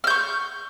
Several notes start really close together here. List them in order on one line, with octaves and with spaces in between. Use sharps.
F6 G6 C#6